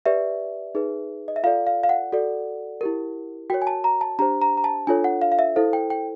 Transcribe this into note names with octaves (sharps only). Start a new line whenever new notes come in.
G4 B4 D5 E5
D#4 G#4 B4
D#5
E5
F4 A4 D5 F5
F5
F5
F#5
F#4 A4 D5
E4 G4 A#4
F#4 A#4 C#5 G5
G#5
A5
A#5
A5
D4 G4 C5 A#5
A#5
A#5
A5
D4 F4 A4 C#5 G#5
F#5
F5
F5
E5
E4 A4 C5 F5
G5
G5